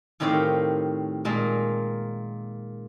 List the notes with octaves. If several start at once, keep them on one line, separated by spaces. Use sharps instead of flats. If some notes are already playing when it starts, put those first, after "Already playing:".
A2 D#3 C4 G4 C#5 F5
A#2 G#3 A#3